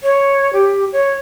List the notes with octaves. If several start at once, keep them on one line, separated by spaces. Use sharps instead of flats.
C#5
G4
C#5